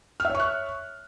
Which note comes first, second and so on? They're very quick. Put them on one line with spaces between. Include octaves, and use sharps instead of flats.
F6 E5 C#5 C#6 F#6